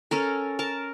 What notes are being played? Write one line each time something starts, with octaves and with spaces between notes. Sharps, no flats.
C#4 A4 A#4
A#4 A5